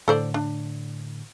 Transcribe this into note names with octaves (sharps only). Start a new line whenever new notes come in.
A2 D3 A4 C5 D5
D4